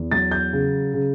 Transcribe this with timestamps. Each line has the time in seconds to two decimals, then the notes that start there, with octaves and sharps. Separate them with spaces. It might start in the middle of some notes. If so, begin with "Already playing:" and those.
Already playing: E2
0.12 F#3 A6
0.31 G6
0.53 C#3
0.94 C#3